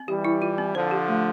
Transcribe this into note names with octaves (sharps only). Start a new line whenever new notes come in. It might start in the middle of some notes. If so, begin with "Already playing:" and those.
Already playing: C4
E3 G3 G4
E4
F4
C4
D3 F3 C5
G4
A3